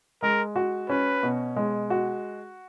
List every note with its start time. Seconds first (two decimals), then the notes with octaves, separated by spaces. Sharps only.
0.22 G#3 A#4
0.56 F#4
0.89 C#4 B4
1.23 B2
1.56 G#3
1.90 F#4